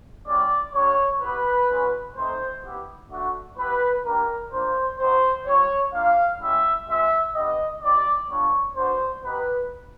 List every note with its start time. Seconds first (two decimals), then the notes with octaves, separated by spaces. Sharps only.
0.27 G#3 C#4 E4 G4 D5
0.74 A#3 D4 G4 C#5
1.21 B3 E4 G4 B4
1.69 G#3 C#4 F#4
2.16 A3 C4 D#4 C5
2.63 B3 E4 G4
3.11 A3 D4 F#4
3.57 B3 E4 G4 B4
4.05 A#3 D4 G4 A#4
4.52 A#3 D4 F4 C5
4.99 C4 D#4 F#4 C5
5.46 G3 C4 F4 C#5
5.94 A#3 D4 F4 F5
6.41 G#3 C#4 E4 G4 E5
6.88 G#3 C4 F4 E5
7.35 B3 D4 G4 D#5
7.82 C4 E4 G4 D5
8.29 G3 B3 D4 F4 C#5
8.77 B3 D4 F#4 C5
9.24 B3 D#4 G4 B4